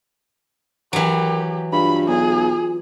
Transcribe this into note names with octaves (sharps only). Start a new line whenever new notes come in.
E3 F#3 G4 A#4
G2 F4 B5
B1 G#4